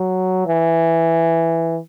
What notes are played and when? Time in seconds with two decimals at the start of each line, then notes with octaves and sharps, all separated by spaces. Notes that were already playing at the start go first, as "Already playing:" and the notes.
Already playing: F#3
0.47 E3